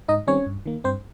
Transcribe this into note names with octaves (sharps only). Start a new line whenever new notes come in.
G#2 D#4 D#5
D#3 G3 C4 C#4 C#5
G2
D#3 A#3
G2 C4 C5